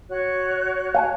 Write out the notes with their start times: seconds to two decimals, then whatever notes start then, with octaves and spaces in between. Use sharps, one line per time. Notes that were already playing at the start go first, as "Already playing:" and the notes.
0.08 F#4 C#5 F#6
0.95 F5 G#5 A5